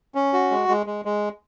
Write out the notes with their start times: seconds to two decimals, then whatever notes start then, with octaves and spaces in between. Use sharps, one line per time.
0.15 C#4
0.33 F#4
0.51 G#3
0.69 G#3
0.86 G#3
1.05 G#3